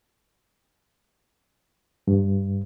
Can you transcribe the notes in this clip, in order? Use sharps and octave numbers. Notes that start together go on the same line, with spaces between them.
G2